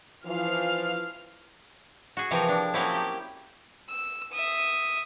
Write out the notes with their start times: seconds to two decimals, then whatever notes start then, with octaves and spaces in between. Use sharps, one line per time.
0.25 E3 F3 F5 F6
2.17 F#4 G#4
2.31 C3 E3 F3 C4 A#4
2.48 D4
2.74 F3 F#3 A#3 C4 C#4 E4
2.93 G4
3.89 E6
4.32 E5 D#6